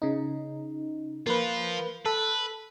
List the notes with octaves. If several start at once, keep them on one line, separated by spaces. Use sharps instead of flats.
C#3 D#4
F3 A#3 F4 B4
A4 B4